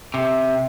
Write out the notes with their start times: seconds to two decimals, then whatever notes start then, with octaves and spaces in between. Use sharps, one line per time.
0.14 C3